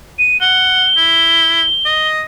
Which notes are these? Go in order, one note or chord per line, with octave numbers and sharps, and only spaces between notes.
D#7
F#5 G7
E4
D#5